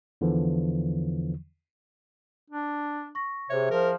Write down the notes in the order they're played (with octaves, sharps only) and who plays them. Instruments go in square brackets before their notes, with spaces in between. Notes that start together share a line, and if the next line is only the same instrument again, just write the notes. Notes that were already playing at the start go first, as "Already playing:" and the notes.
[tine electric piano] E2 D3 E3 F3
[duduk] D4
[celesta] C#6 A#6
[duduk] C3 [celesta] G#4 C5 E5 [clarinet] C#5
[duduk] F3 [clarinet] A#4